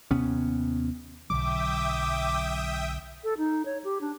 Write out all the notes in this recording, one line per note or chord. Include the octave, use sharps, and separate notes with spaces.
D#2 C3 B3 C#4
B1 D3 F#3 E5 G5 D6 D#6
A4
D#4
C#5
G4
D4